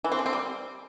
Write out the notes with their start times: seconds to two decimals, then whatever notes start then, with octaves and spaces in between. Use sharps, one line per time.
0.04 E3
0.12 C4
0.19 D3
0.26 C4
0.33 G3